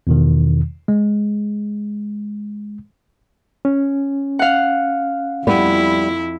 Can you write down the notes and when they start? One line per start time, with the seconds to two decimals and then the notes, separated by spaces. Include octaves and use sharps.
0.07 E2 B2 D#3
0.88 G#3
3.65 C#4
4.39 F5 F#5
5.47 F2 G3 B3 E4